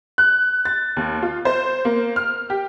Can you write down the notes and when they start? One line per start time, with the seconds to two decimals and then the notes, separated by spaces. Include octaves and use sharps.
0.18 F#6
0.65 A6
0.97 D#2
1.22 F4
1.45 C5
1.85 A#3
2.16 F6
2.50 G4